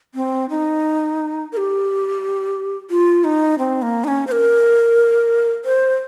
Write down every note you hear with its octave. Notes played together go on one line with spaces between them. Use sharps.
C4
D#4
A#4
G4
F4
D#4
C4
A#3
D#4
C#4
C5
A#4
C5